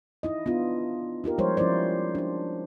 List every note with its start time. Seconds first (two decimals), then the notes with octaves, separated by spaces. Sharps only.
0.23 D#4 E4 D#5
0.46 B3 D4 F4
1.24 D#4 F4 G4 A#4
1.38 F3 G3 G#3 A#4 C5 C#5
1.57 F3 C#4 E4 C5 D5
2.15 D4 C5